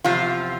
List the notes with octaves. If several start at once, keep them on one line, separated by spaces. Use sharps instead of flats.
E2 C3 F3 F4